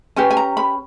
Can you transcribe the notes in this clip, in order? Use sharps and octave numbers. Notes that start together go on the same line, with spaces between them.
C#4 G4 B4 G#5
G#5
A#5
B5